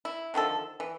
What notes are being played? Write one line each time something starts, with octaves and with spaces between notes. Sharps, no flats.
E4
D3 D#3 F3 A4
E3